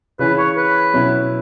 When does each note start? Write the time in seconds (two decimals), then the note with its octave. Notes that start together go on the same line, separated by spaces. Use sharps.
0.19 C#3 E3 C#4 B4
0.38 C#5
0.57 B4
0.94 B2 F#3 C#4 E4